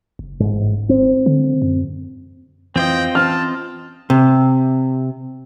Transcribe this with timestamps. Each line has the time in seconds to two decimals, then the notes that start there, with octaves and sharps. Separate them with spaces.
0.19 F#1
0.40 A1 G#2
0.89 G#1 C4
1.26 D3
1.62 F#2
2.76 F2 E3 C4 F4 D#5 G5
3.15 E3 C#4 A5 F6
4.10 C3